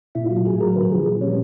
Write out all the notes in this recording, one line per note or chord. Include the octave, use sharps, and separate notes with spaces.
A#2 E4
F4
F#3
F4
A2 G#4
F#3 A#4
D3 B4
F3 G#4
A#2
G3 C#4